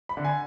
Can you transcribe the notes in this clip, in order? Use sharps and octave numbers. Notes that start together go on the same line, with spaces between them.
B5
D3
G#5